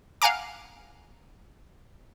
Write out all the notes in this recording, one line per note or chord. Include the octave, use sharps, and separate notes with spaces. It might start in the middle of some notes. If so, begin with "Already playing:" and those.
F5 F#5 G#5 A#5 D6